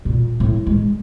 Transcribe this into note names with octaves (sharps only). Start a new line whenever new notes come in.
A#2
A2
G#3